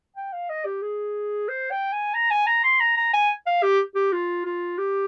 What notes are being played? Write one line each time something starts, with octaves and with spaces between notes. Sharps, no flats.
G5
F5
D#5
G4
G#4
C5
G5
G#5
A#5
G#5
A#5
C6
A#5
A#5
G#5
F5
G4
G4
F4
F4
G4